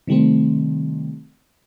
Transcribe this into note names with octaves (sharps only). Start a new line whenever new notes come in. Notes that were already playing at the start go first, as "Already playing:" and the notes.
C3 D#3 G3 A3 C4